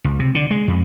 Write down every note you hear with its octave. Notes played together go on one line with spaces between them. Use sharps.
C#2
C3
D3
G#3
F2